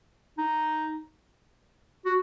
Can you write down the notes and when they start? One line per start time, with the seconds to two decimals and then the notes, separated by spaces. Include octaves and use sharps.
0.38 D#4
2.05 F#4